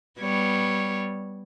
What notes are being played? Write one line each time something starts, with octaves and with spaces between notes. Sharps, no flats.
G3 B3 C#5